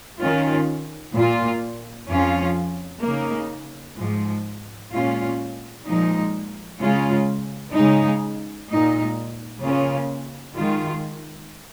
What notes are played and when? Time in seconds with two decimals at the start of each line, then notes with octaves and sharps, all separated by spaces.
0.21 D#3 C#4 F4
1.15 A#2 A#3 F4
2.09 F2 F3 C#4 F4
3.03 C#3 A#3 D#4
3.97 G#2 F3 G#3
4.91 A#2 G#3 C#4 F4
5.86 A#2 F3 G#3 D#4
6.80 C#3 G#3 C#4 F4
7.73 C#3 G#3 D#4
8.69 A#2 G#3 D#4
9.62 C#3 A#3 C#4 F4
10.56 D#3 G#3 F4